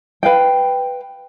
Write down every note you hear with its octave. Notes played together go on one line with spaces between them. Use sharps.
B4 F5 G5